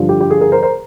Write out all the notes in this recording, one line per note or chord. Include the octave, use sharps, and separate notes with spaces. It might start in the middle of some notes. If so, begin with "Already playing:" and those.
Already playing: G2 D3 F3
G4
G4
G#4
G#4 A#4
A#4 C5
A#4 C5